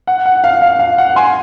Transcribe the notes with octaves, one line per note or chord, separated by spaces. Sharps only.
F#5
F#5
F5
F5
F5
F#5
G#5 C6